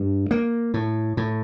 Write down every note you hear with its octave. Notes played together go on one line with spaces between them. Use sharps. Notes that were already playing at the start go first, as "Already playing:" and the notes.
Already playing: G2
A#3
A2
A2